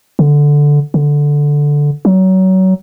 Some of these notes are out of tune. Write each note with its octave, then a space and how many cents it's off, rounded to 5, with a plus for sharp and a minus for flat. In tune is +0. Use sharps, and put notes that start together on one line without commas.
D3 -5
D3 -5
F#3 +25